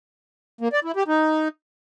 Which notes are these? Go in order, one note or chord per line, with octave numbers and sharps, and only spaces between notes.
A#3
D5
E4
G4
D#4